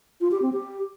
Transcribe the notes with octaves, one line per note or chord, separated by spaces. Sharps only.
F4
G4
C4
G4